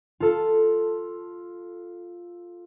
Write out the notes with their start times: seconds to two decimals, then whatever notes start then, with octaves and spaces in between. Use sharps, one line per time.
0.20 F4 A4